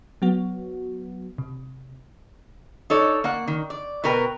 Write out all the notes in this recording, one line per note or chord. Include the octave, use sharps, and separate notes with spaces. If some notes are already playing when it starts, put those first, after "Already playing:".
F#3 B3 F#4
C3
D#4 A4 C#5 D5
A#3 D5 F#5
D#3
D5
B2 F#4 A#4 B4 G5